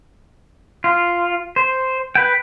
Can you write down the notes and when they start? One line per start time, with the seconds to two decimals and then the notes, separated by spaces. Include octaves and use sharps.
0.84 F4
1.56 C5
2.15 B4 G5